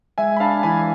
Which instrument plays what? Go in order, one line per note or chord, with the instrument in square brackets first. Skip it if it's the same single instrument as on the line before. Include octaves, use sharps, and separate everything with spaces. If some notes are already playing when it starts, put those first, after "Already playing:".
[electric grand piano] G#3 E5 G#5
B5
D4 F5 A5
E3 G#5 B5